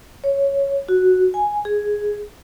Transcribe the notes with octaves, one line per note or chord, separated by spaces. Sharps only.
C#5
F#4
G#5
G#4